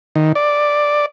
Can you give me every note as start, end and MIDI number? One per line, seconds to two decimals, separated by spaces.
0.16 0.32 51
0.35 1.06 74